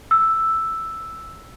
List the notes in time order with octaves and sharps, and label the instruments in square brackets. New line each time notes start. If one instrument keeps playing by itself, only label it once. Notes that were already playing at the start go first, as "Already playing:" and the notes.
[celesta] E6